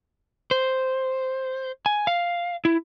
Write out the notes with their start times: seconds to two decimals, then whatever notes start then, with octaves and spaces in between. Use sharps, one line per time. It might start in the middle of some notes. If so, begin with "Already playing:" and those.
0.51 C5
1.86 G#5
2.07 F5
2.65 E4